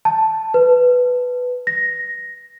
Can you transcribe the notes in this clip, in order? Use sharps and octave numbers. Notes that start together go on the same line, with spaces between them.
A5
B4
A#6